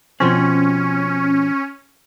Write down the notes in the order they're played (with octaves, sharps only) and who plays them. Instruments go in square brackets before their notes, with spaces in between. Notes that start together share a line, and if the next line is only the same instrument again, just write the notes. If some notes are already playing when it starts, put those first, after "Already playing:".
[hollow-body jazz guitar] B2 F3 C4 [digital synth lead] C#4